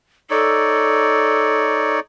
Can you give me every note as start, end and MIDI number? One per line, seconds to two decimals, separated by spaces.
0.30 2.00 63
0.30 1.98 69
0.30 2.00 73
0.30 2.00 74